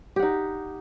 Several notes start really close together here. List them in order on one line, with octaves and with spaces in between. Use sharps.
G4 F#5 D#4